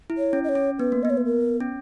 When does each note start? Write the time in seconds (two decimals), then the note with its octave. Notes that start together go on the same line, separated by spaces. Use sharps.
0.10 E4
0.18 C#5
0.33 C#4
0.44 D#5
0.49 C#5
0.55 C#4
0.79 B3 B4
0.92 A#3
1.03 B3 D#5
1.10 C#5
1.17 B4
1.25 A#4
1.60 C#4